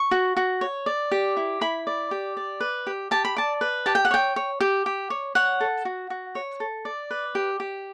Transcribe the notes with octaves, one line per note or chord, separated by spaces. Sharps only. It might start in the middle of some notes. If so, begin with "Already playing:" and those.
Already playing: C#6
F#4
F#4
C#5
D5
G4
E4
E4 B5
D5
G4
D5
B4
G4
G4 A5
B5
D5 A5
B4
G4 A5
G5
F#5
C#5 G5
C#5
G4
G4
C#5
C#5 F#5
A4
F#4
F#4
C#5
A4
D5
B4
G4
G4